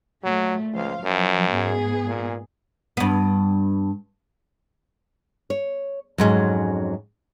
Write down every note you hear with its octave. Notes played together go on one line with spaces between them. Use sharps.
A#2 F#3 A3
C#2 F3 C5 F5
F#2 F3 F#3
G#2 B3 G#4
A#2
G2 B3
C#5
F2 G#2 F#3 C#4 G#4